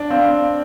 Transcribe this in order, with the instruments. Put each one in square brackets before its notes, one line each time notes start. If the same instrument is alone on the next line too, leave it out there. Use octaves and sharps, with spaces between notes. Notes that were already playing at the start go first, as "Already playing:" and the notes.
Already playing: [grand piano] D4
[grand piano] C4 [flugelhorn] F5